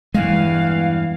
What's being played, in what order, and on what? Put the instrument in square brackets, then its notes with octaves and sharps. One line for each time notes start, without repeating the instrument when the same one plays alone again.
[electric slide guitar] E2 G2 E3 [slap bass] G#3 [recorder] F5